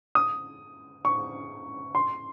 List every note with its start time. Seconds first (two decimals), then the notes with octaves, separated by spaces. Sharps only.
0.15 D#6
1.05 C#6
1.95 C6